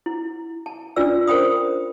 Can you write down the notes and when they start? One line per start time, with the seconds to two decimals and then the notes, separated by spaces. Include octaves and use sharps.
0.06 E4
0.66 A5
0.96 C#4 D4 F4 B4 D5 E6
1.27 A#4 C5 G5 B5 D#6